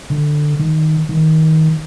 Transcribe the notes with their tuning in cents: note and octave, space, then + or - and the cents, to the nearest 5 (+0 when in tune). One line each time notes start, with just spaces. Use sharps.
D3 +15
D#3 +5
D#3 +25